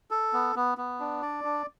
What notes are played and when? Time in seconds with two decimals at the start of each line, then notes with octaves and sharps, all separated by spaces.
0.11 A4
0.33 B3
0.56 B3
0.78 B3
1.00 D4
1.22 D5
1.44 D4